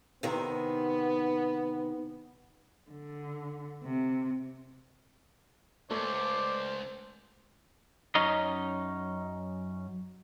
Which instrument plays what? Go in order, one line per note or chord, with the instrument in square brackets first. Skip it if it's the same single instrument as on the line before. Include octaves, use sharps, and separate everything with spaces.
[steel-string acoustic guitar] C3 D#3 [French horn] B3
[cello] D3
C3
[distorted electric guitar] C#2 [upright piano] A3 [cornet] C5 [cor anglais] D5
[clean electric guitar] F#2 C#4 D#4 D#5